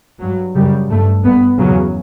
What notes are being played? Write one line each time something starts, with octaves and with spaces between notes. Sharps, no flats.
G2 F#3
F#2 C#3 G3
G2 A3
G2 B3
E2 C#3 F#3